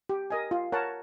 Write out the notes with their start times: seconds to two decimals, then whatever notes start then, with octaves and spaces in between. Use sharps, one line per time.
0.09 G4
0.30 A#4 D#5 G#5
0.51 F4
0.72 A#4 C#5 F#5 A5